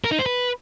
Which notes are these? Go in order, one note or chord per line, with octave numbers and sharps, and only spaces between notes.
A#4
D#4
C5
B4